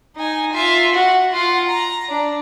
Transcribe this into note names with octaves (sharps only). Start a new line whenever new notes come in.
D#4 G#5
F4 E5
F#4
F4 F#5
A#5
D4